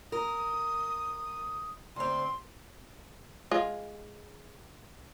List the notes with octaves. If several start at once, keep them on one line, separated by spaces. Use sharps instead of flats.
A#4 D#6
D2 C4 C6
G#3 F4